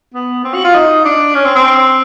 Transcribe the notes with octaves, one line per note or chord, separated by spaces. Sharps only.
B3
C4
F#4
F4
D#4
D4
C#4
C4
C4